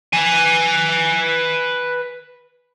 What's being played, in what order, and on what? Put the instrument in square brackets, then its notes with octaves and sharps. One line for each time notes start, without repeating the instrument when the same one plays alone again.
[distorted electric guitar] B4 G#5